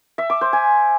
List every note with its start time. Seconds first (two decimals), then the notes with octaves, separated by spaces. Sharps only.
0.18 E5
0.30 D6
0.41 C5
0.53 G#5